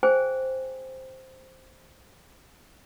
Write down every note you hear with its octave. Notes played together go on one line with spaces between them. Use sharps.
G#4 C5 G5 G#5